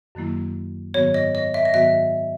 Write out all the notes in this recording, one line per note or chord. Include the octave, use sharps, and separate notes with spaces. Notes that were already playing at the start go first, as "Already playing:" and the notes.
F#2 D#3 F#3 A#3 E4
G#2 D#3 F#3 B3 F#4 C#5
D#5
D#5
E5
D#5
G#2 D#3 F#3 B3 F#4 E5